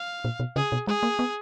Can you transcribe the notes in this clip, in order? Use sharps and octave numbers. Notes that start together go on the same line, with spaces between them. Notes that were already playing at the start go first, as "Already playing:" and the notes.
Already playing: F5
A#2
B2
C#3 G#4
B2
G#3 G#4
A#3
B3